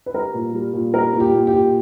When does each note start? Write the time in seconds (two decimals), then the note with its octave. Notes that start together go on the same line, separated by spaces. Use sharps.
0.06 B4
0.14 G3 A#4
0.34 A#2
0.53 G3
0.73 A#2
0.93 G3 A#4
1.14 A#2
1.20 G4
1.34 A#2
1.47 G4
1.53 A#2